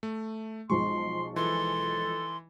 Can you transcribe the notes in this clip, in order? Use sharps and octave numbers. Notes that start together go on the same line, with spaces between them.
A3
B1 F3 G#3 C6 C#6
E3 A4 C6